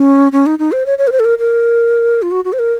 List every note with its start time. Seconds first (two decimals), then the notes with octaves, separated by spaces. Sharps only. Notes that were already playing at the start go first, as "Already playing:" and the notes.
Already playing: C#4
0.32 C#4
0.46 D#4
0.59 D#4
0.72 C5
0.86 C#5
0.98 C#5
1.07 A#4
1.12 C5
1.20 A4
1.25 A#4
1.39 A#4
2.22 F4
2.31 F#4
2.45 F#4
2.53 C5
2.59 A#4